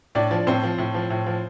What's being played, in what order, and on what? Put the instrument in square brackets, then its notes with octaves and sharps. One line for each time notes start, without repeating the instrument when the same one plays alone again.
[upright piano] A2 D4 D5
F3
A2 C4 C5
F3
A2
F3
A2
F3